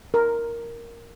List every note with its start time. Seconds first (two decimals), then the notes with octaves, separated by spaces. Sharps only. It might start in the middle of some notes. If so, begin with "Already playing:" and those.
0.14 A#4